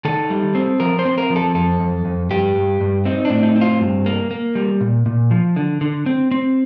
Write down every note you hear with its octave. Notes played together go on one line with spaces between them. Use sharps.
D#3 A4
G3
C4
F3 A#4
C5
C4
A#4
F3
A4
F2 A4
F2
F2
G2 G4
G2
G2
C4 D#4
D4
A2
D#4
C4
F4
G2
A#3
A#3
G3
A#2
A#2
F3
D3
D3
C4
C4